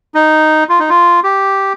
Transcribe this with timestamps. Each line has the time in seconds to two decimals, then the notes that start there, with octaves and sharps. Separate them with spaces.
0.15 D#4
0.69 F4
0.79 D#4
0.89 F4
1.24 G4